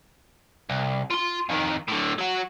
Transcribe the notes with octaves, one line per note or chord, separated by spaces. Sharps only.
C2
F4 C6
F2 D#3
A2 D3
F#3 F#4